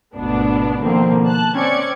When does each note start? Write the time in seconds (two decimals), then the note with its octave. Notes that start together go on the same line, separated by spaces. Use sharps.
0.16 G#1 D2 B2 B3 D4
0.83 B2 D3 D#3 F3 A#3 C4
1.26 A5 F#6
1.56 C4 C#4 D5 G#6 C#7